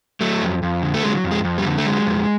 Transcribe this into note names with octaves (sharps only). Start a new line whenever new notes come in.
F#3 A3
F2
F2
D3
A3
F#3 G#3
F2
G#3
F2
G3
D3
A3
F#3 G#3
F2